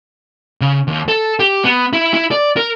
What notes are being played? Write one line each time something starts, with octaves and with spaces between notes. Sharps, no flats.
C#3
D#2
A4
G4
B3
E4
E4
D5
A#4